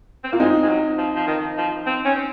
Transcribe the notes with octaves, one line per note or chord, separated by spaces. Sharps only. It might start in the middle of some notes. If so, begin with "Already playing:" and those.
C4
A#3 F4
G#3 C4 D#4
G#3
F#3
F3
F3
D#3
F3
C4
C#4
C4